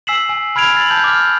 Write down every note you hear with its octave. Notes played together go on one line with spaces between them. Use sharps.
G#5 E6 B6 C7 E7 F#7
G#5
G#5 B5 F6 G#6 D7 F7
A6 F#7
A5 G6
D6 F6